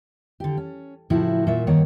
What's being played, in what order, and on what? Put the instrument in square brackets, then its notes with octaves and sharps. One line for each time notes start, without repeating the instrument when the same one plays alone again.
[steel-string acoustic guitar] D3 G4
C#4
A2 C#3 F3 E4 F#4
A#2 F#3 A#4 E5
G2 D#3 A#3 C#5 F#5